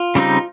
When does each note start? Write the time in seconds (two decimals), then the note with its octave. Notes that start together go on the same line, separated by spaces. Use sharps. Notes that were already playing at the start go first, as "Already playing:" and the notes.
Already playing: F4
0.15 C#3 G3 C4 D#4